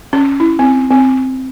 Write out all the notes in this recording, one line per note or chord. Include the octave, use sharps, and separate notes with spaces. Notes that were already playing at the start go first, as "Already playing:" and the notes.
C#4
E4
C4
C4